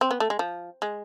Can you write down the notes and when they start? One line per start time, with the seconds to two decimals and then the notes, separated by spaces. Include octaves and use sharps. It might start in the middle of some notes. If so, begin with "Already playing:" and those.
0.01 C4
0.11 B3
0.20 A3
0.30 G#3
0.39 F3
0.82 G#3